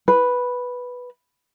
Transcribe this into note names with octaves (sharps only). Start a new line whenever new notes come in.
B4